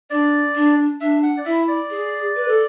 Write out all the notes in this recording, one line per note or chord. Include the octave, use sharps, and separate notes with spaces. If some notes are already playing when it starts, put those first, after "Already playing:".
D4 D5
D4
D4 E5
F#5
D5
E4 E5
D5
G#4
B4
A4